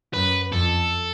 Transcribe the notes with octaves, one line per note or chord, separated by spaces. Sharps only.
F#2 B4
F2 A4